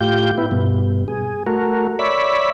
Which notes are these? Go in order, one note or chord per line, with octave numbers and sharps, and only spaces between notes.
A2 F4 G4 G6
B3 E4
G2 B2
G#4
A3 F#4 A#4
C#5 D5 E5 B5